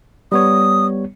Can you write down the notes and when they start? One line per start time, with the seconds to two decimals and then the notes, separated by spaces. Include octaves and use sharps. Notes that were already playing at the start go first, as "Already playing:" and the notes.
0.32 G3 B3 C#5 D#6